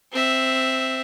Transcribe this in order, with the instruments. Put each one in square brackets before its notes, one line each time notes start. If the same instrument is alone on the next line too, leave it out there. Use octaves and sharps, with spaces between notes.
[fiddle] C4 E5